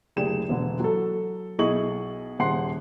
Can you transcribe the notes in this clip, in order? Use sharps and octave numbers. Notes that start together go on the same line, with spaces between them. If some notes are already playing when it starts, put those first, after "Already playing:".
F#1 D2 D4 G4 G#4 E7
E1 D3
F#3 A4
B1 E4 G#4 D#5 C#6 F#7
D#1 C#3 F#5 C6 C7